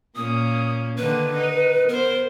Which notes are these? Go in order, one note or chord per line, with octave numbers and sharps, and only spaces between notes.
A#2 A#3 C#4 D#6
D3 D#3 A#3 B4
D#4
B3 A#4 C5